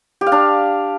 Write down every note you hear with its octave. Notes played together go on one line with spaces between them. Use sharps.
G4
F5
D4